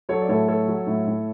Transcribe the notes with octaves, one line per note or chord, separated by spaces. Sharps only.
F#3 A4 C#5
D5
A2 A4 C#5
F#3 A4 C#5
F#3
A2
A2